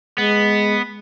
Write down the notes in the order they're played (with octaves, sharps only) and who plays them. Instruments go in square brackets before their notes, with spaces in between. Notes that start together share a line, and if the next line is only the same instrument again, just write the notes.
[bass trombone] G#3 [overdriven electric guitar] B3